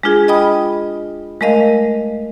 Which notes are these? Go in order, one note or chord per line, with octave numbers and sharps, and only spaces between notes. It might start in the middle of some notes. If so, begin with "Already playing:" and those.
G#3 D4 F4 G#4
D#5 G5 B5 D#6
G#3 A3 A#4 D#5 F5